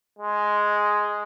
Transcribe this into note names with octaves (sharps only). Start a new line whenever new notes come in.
G#3